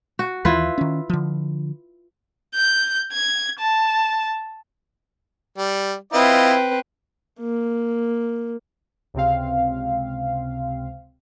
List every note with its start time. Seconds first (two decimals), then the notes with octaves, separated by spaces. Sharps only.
0.19 F#4
0.45 D#2 E3 E4 F4 B4
0.78 D#3 C#4
1.10 D3 F3
2.55 G6
3.12 G#6
3.59 A5
5.58 G3
6.13 C4 E4 F4 B4 D#5
7.39 A#3
9.14 C#2 C3 C4 F5